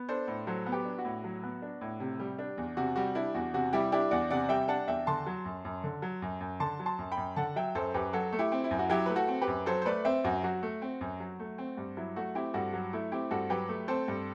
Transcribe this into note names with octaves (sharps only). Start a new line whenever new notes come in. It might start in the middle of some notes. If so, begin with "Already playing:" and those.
Already playing: B3
D4 A4 C5
A2
F#3 A4 C5
B3
G4 B4
D4
F#4
A2
F#3
B3
D4
A2
C3
G3
D4
E2
C3 F#4
G3 F#4
D4 E4
E2 F#4
C3 F#4
G3 E4 G4
D4 E4 G4
E2 D5 F#5
C3 D5 F#5
G3 E5 G5
D4 F#5 A5
E2 E5 G5
D3 A5 C6
F#3
F#2
F#2
D3
F#3
F#2
F#2
D3 A5 C6
F#3
A5 C6
F#2
G5 B5
F#2
D3 F#5 A5
F#3 E5 G5
F#2 A4 C5
F#2 G4 B4
F#3 F#4 A4
A3
E4 G4
C4
E4
F#2
F#4
F#3 E4 G4
A3 B4
F#4 A4
C4
G4 B4
F#2
F#3 A4 C5
C5
A3 B4 D5
C4 C5 E5
F#2 F#4
F#3 F#4
A3
C4
F#2
F#3
A3
C4
G2
F#3 E4
A3 F#4
C4 E4 G4
G2 F#4 A4
F#3 F#4
A3 E4
C4 E4 G4
G2 F#4 A4
F#3 G4 B4
A3
C4 A4 C5
G2